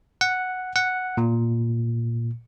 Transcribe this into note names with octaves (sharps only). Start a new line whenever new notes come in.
F#5
F#5
A#2